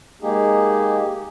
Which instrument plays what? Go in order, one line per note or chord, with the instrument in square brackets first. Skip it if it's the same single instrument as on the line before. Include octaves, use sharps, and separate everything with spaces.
[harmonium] G#3 A#3 D#4 G4 G#4